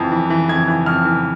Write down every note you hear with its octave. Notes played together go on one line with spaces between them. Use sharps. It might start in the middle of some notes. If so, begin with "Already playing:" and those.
Already playing: F2 E3
E3
E3
F2 G#6
E3
F2 F6
E3